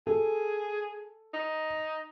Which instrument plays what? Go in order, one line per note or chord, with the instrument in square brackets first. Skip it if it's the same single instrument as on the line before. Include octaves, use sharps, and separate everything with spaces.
[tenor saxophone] G#4 [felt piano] A4
[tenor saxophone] D#4